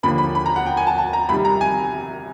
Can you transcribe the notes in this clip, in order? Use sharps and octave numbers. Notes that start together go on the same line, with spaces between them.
D#2 D3 F3 A#3 B5
B5
B5
A#5
F#5
G5
G#5
A5
A5
A#5
C2 C3 D#3 G3 B5
A#5
G#5